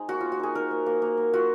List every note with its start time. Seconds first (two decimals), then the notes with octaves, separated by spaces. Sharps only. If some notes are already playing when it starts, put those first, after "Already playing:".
Already playing: G#3 C4 D#4 G#4 C5
0.08 A#3 F#4
0.21 A#3 F4
0.32 F#4
0.40 D#4 G#4
0.55 D#4 A#4
0.71 A#3
0.86 A#3
1.02 A#3
1.17 A#3
1.34 F4 F#4